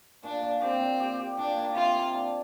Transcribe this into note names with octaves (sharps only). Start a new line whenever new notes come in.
A#2 D4
A#2
C4 G4
A#2
G4
G4
A#2 D4
A#3
C3 F4
A#3
D4